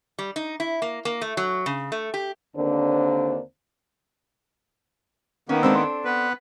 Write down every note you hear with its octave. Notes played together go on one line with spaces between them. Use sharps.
G3
D#4
E4
A#3
A#3
A3
F#3
C#3
A3
G4
D#2 D3 A#3 C4 D4 C5
D#3 A#3 B3 C#4
G#3 C4 D4 A4 C5 E6
C6
B3 B4